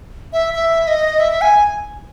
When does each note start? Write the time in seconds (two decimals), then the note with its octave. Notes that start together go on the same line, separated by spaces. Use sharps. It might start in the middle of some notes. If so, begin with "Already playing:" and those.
0.33 E5
0.54 E5
0.87 D#5
1.19 E5
1.41 G#5